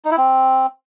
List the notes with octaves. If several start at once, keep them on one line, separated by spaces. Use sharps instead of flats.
D#4
E4
C4